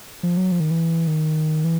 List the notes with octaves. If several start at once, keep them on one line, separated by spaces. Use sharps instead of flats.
F3
F#3
F3
D#3
E3
D#3
E3